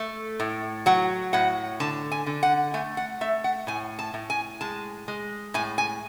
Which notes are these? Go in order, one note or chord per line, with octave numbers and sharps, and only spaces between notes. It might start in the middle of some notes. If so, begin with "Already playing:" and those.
Already playing: A3
A2
F#3 F#5
A2 F#5
D3 A5
G#5
D3
F#5
A3 G#5
F#5
A3 E5
F#5
A2 G#5
A5
A2
G#5
G#3 A5
G#3
A2 G#5
G#5